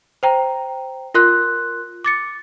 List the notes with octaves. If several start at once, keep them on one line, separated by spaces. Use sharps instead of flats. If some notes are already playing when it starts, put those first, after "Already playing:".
C5 G5 A#5
F4 A#4 C6 F#6
D6 A6 C#7